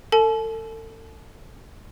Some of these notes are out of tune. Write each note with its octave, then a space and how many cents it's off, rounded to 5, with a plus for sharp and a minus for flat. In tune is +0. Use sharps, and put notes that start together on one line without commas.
A4 +35 A5 -40